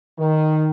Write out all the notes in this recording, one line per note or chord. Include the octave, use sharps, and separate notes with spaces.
D#3